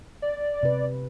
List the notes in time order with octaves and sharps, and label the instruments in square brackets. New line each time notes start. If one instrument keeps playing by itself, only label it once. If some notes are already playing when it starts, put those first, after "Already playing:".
[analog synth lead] D5
[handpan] C3 B4